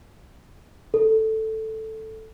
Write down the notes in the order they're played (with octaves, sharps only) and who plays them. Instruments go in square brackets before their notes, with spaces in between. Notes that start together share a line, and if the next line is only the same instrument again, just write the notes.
[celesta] A4